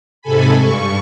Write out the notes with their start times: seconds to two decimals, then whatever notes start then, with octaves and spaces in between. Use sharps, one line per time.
0.22 G#2 C3 A4 G#5 B5
0.55 G2 C#6